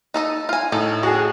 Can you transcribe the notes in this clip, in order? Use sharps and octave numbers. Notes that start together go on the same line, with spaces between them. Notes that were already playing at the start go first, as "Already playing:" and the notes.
D#4 A4 D#5
F4 G#5
A2 D#4 A4
D4 F#4 G#4